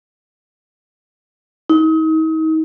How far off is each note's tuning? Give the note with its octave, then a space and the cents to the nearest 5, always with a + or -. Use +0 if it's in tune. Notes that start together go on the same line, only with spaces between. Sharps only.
D#4 +40